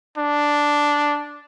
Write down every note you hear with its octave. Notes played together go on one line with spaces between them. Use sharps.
D4